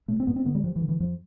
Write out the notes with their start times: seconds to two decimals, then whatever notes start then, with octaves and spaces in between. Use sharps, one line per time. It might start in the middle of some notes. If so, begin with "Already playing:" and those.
0.08 B2 A3
0.20 C4
0.27 G2 B3
0.36 C4
0.45 D3 B3
0.55 G3
0.63 G2 F3
0.76 E3
0.81 D3
0.89 E3
1.00 F2 F3